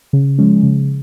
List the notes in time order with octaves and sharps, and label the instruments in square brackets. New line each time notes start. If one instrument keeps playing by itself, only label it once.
[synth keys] C#3
F3 G#3 C#4
C#3